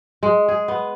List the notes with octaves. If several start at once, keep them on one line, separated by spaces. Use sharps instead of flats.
G#3
G#4
B3